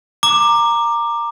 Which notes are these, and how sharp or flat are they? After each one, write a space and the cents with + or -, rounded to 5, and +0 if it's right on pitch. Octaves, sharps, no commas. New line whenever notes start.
A#5 -5 D6 +15